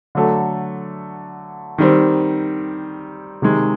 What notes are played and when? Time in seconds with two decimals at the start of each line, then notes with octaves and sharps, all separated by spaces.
0.15 D3 F#3 A3
1.78 D#3 G3 C4
3.42 C3 D#3 G#3